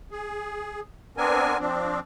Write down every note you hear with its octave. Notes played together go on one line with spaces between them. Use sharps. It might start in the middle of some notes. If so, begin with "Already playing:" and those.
G#4
B3 C4 D4 A#4 G#5
F3 C4 D4